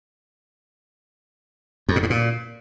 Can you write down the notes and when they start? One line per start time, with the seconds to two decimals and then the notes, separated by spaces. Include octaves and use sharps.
1.89 F2
1.96 A#2
2.03 G#2
2.10 A#2